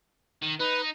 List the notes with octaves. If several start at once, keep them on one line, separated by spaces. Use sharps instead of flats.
D#3
D#4 B4